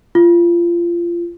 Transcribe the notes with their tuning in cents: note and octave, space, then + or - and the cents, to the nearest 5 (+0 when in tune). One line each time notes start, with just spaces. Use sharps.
F4 -25